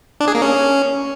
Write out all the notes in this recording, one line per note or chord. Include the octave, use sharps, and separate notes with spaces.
D4
G#4
A#3
C#4